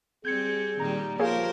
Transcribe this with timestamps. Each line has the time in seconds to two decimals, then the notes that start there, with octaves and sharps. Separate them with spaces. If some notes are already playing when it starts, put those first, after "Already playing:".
0.25 G3 C4 G#4 G6 G#6 C#7
0.80 A#2 D#3 G3 A#5
1.20 F3 A#3 G4 G#4 A#4 C5 C#5 F5